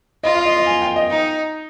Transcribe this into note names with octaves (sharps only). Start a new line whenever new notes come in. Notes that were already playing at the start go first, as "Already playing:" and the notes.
F4 D#5
F5
D#5
D#5
G#5
G5
D#5
D#4